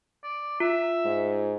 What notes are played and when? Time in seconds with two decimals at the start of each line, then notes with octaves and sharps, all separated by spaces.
0.23 D5
0.60 F4 E5
1.05 G#2